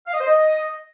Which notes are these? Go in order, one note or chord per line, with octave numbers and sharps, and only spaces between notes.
F5
D#5
C5
D#5